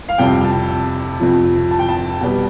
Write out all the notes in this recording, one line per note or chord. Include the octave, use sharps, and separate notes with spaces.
F5
F2 C3 G3 G5
A5
F2 C3 F3
A5
G5
A5
B2 G3